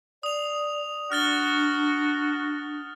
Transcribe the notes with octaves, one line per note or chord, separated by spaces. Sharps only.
D5 D#6 F7
D4 F#4 F6 A6 G7